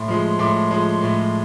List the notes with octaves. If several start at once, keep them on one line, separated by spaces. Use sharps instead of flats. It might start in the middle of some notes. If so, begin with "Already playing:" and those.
Already playing: A2 C6
F3 G#3
A2 C6 D6
F3 G#3
A2